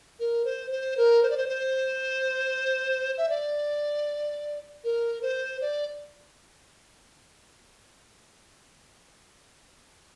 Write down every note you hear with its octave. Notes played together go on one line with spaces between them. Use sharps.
A#4
C5
C5
A#4
C5
D5
C5
C5
E5
D5
A#4
C5
D5